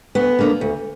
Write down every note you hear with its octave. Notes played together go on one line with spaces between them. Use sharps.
D2 B3
D3 A#3
D2